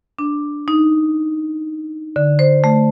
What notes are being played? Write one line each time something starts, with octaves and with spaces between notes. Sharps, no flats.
D4
D#4
D3
C5
A3